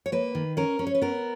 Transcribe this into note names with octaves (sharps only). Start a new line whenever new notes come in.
C#5
A#3 B4
D#3
C#4 A#4
C#4
C#5
B4
B3 A#4